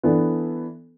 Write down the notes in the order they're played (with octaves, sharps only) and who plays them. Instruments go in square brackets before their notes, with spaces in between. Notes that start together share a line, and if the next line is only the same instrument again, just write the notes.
[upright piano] E3 B3 D4 A4